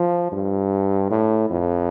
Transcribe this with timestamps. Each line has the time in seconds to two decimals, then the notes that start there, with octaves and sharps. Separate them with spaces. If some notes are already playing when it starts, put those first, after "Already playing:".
Already playing: F3
0.32 G2
1.10 A2
1.50 F2